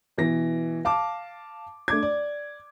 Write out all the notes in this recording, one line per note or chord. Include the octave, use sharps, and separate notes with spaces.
B2 E3 A#6
F5 A5 D6
A3 D4 D6 G#6
D5